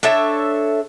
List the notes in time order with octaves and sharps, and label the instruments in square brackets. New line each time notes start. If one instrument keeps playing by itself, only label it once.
[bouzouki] D4 A4 C#5 E5